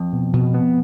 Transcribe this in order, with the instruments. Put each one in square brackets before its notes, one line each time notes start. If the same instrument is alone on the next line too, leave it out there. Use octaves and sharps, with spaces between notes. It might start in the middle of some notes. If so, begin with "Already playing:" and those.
Already playing: [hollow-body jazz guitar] F2
[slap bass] B2
B2
B3